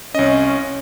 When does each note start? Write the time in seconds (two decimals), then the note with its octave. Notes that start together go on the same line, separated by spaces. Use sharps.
0.15 C2 C#4 D#5